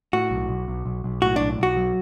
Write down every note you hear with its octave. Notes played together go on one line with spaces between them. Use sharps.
A2 F#4
B1
B1
B1
B1
B1
A2 F#4
B1 D4
B1 F#4
F#3